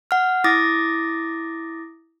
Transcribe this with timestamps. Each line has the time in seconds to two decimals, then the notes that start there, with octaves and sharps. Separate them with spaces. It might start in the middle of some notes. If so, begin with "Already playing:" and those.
0.11 F#5 F6
0.44 E4 D6 D#6 A6 A#6